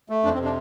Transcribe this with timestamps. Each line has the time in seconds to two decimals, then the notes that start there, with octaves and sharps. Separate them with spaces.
0.09 A3
0.23 F2 D4
0.34 C4
0.39 C3
0.44 D4